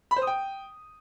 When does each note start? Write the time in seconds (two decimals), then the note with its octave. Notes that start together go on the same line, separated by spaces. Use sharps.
0.11 B5
0.16 C5
0.22 D#6
0.27 G5